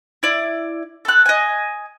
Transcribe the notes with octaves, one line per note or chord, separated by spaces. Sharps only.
E4 D5
A4 F#6
D#5 G#5